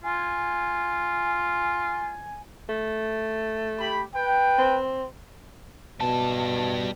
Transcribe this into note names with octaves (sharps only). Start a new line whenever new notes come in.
F4 G#5
A3
G4 B5
B4 G5
C4
B2 G3 A5